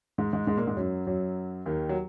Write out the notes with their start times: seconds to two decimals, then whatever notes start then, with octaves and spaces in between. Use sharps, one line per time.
0.18 G#2 G#3
0.33 G#2 G#3
0.47 G#2 G#3
0.57 A#2 A#3
0.67 G#2 G#3
0.77 F#2 F#3
1.07 F#2 F#3
1.66 D#2 D#3
1.89 F#3